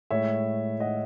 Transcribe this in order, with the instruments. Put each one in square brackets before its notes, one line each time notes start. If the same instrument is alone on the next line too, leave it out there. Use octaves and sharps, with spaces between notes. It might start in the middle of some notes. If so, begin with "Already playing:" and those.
[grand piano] A2 G#3 C#5 E5
D#5 F#5